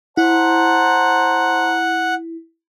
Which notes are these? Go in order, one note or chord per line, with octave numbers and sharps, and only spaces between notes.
E4 C5 F#5 A5 A#5